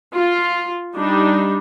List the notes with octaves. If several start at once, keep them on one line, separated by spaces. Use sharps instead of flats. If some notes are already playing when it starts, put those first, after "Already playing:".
F4
G3 D4 D#4